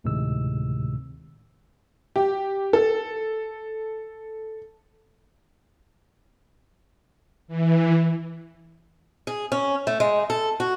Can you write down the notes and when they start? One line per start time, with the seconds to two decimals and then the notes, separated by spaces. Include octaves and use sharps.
0.04 D2 A2 C3 D#3 G#3 E6
2.16 G4
2.73 A4
7.48 E3
9.27 G#4
9.52 C#4
9.87 A3
10.00 G#3
10.30 A4
10.60 F#4